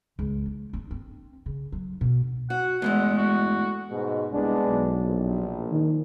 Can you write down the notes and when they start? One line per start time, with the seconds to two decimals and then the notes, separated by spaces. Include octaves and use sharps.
0.19 C#2
0.46 F3
0.73 D4
0.91 C4
1.46 C#3
1.72 F#3
2.01 B2
2.50 F#4 F#5
2.82 E2 G2 G#3 A3
3.18 F#4
3.90 G#2 B2
4.32 C2 G#3 B3 D4
4.66 B1
5.07 A#1
5.72 D#3